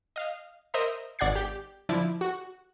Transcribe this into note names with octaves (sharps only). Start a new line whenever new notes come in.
D#5 F5
A#4 C5 D#5 E5 A#5
G#1 D5 F#5 F#6 G#6 C7
G4
D3 F3 E4 D5
F#4